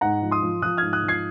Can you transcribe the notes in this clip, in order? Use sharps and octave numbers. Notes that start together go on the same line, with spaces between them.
G#2 F#5 A#5
F3
C6 D#6
F3
F3 D#6 F#6
G#2 F6 G#6
D#6 F#6
F3
G#6 C7